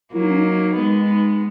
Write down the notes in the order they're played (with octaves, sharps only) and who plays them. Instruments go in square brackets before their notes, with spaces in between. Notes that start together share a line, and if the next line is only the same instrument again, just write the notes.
[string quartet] F#3 A#3 [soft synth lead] E4
[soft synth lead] D#4
C#4
D#4
[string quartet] G#3 B3